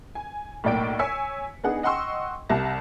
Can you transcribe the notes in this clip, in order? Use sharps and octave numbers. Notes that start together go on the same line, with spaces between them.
G#5
B1 A2 A#3 D5 G5 D7
C#5 G#5 E6 B6 C#7
B3 D4 D#4 G#4 F#5
D#5 F#5 G5 C6 C#6 E6
C2 G3 E5 A5 A#6